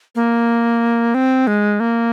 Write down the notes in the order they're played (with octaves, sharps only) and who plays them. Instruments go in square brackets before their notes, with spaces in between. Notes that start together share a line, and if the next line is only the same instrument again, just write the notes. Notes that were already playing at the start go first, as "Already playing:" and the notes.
[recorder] A#3
C4
G#3
A#3